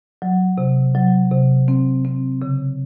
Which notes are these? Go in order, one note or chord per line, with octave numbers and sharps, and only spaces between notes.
F#3
C3
F#3
C3
C4
C4
C#3